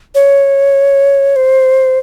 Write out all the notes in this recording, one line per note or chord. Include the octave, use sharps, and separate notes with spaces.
C#5
C5